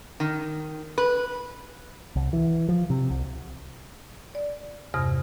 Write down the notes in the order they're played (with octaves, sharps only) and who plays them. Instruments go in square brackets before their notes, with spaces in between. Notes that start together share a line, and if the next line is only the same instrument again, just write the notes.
[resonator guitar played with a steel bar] D#3
B4
[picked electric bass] C2
E3
F3
C3
C2
[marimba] D5
E2 G2 C3 D#6 F6